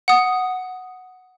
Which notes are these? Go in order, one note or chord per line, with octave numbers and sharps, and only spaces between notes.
F#5 D#6